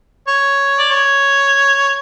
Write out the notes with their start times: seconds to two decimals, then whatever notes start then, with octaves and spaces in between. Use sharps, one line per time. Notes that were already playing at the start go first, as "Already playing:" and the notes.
0.28 C#5
0.79 D5
0.90 C#5